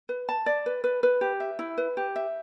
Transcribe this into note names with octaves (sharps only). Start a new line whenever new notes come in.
B4
A5
D5
B4
B4
B4
G4
E5
E4
B4
G4
E5